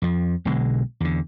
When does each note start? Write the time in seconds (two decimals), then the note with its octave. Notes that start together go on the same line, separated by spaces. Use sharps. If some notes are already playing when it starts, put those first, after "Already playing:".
0.02 F2 F3
0.45 B1 B2 D3 G#3
1.00 E2 D3